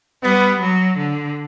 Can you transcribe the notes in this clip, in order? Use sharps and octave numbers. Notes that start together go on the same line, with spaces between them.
G3 B3
F#3
D3